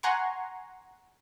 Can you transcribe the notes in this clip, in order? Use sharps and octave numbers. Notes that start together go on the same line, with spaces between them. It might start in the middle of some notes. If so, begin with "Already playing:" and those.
F#5 G#5 A#5 C6 C#6